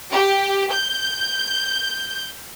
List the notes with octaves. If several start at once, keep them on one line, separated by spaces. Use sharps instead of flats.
G4
G6